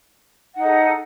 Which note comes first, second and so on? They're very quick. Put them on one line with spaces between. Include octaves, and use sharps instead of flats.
F#5 D#4 A4 G#4